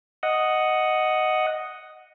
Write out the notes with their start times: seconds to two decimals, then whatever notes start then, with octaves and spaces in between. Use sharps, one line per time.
0.23 D#5 F#5